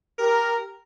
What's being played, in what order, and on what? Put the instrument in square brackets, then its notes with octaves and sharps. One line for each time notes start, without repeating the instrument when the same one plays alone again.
[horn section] G4 A#4